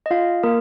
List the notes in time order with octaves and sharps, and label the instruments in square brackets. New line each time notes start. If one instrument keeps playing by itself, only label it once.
[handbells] D#5
F4 F5
A#3 A#4